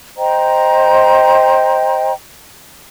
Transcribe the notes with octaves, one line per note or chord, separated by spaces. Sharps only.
C5 D#5 G5 A#5